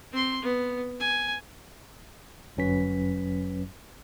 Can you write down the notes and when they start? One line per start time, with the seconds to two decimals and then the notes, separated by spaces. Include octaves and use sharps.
0.12 C4 C6
0.43 B3
1.00 G#5
2.57 G1 F#2 F#3 C#4 B4 B6